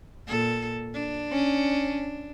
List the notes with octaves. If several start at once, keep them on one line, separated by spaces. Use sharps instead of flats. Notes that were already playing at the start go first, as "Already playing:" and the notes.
A#2 A4
D4
C#4